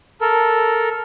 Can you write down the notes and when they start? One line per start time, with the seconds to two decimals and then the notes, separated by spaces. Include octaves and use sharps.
0.21 A4 A#4